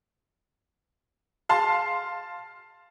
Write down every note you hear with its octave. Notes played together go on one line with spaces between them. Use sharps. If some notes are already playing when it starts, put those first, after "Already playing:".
F5 A5 C6